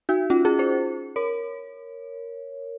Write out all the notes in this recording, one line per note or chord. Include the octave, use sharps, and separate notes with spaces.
D#4 F#4
C#4 F4
F4 G#4
G#4 C5
A#4 C#5